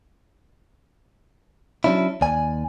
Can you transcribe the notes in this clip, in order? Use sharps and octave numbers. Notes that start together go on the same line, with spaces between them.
F#3 C#4 D4 E4
D#2 D5 G#5